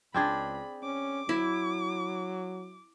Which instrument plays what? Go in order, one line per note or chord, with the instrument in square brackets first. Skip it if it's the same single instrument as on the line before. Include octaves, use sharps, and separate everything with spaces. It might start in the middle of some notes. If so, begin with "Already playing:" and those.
[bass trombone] C#2 [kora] C4 D4 G#4 [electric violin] B5
[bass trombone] C#4 [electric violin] D6
[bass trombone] F#3 [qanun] E4